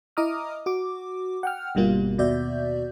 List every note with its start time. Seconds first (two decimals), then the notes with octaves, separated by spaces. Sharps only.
0.17 E4 D#5 A#5 D6 D#6 F6
0.66 F#4 D6
1.43 F#5 G5 F6
1.75 G1 G2 B2 G3 A#3 F4
2.18 D#2 B2 F#4 D5 E5 G6